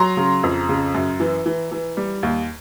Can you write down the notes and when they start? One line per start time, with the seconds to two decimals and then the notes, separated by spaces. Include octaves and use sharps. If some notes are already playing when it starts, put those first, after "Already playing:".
Already playing: F#3 A#5 C6
0.17 C#3
0.43 F2
0.69 C#3
0.94 F#2
1.20 E3
1.46 E3
1.71 E3
1.97 G3
2.23 D#2